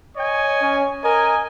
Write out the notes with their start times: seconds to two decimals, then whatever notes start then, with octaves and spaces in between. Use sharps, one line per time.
0.17 C#5 D#5 G#5
0.61 C#4
1.04 A#4 D#5 G#5